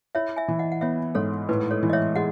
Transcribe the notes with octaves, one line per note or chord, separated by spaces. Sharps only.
E4 C#5 E5
E5 G#5
E3
D#5 F#5
F#5
B3 C#5 E5
G#2 A4 C#5
A2 B4
A4 C#5
E3
D#5
C#5 E5
G#3 D#5 F#5